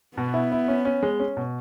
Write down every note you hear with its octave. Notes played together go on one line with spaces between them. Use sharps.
B2 B3
E4
E4
C#4
C#4
G#3
C#4
B2